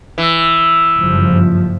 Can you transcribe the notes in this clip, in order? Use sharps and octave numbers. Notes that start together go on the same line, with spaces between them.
E3
F#1 G2 F3